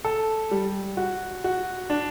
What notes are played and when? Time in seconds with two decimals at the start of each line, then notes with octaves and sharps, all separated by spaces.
0.05 A4
0.51 G3
0.97 F#4
1.44 F#4
1.90 D4